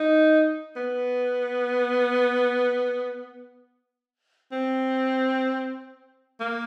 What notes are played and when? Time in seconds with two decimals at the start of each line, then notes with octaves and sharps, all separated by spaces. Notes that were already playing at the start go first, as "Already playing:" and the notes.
Already playing: D#4
0.76 B3
4.52 C4
6.40 A#3